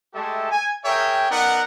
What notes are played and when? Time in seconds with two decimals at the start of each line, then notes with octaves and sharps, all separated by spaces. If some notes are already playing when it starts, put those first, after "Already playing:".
0.14 G#3 A3 G4 A4 E5 A5
0.51 G#5
0.85 G#4 A#4 C#5 E5 G5
1.30 B3 D#4 A#4 D5 F#5